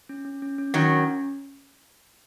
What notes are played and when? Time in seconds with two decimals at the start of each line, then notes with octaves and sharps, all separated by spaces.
0.09 C#4
0.25 C#4
0.42 C#4
0.58 C#4
0.74 D#3 F#3 C#4
0.91 C#4